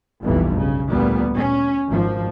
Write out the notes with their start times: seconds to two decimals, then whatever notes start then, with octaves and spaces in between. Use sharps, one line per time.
0.21 F1 B1 G2 E3
0.58 C#3
0.90 D2 A#2 G3 B3
1.35 C#4
1.89 G#1 F3